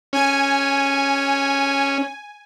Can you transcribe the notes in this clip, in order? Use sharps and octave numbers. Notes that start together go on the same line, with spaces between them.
C#4 G#5